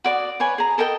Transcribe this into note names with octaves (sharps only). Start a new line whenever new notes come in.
F#4 D5 B5 D#6
B4 C#5 G#5
G#4 A#5
A4 A#4 D#5 G5